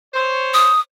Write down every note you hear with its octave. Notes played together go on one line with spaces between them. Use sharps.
C5 C#5
D#6